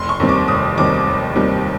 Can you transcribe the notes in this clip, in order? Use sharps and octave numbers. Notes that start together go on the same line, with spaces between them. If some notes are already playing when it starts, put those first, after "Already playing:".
Already playing: F1 C6
C#6
D#2 D#3 G3 C4
D6
F1 D#6
D#2 D#3 G3 C4 D6
F1
D#2 D#3 G3 C4